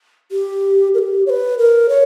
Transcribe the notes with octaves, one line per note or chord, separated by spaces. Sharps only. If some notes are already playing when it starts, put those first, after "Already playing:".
G4
A#4
G4
C#5
B4
A#4
C#5